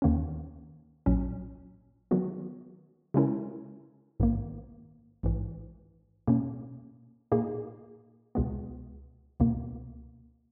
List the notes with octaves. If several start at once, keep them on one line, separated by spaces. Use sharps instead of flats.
D#2 D#3 A#3 C#4
A#1 A#2 F#3 C#4
D#3 F#3 B3 F#4
C#3 G#3 C#4 E4 A#4
A#1 G#2 D#3 A#3
A#1 G#2 E3
B2 A#3 C#4
A#2 A#3 D#4 G#4
C#2 B2 G#3 B3
C#2 B2 A#3